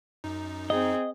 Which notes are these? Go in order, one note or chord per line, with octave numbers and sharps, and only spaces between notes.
F#2 D#4
C4 G#4 D#5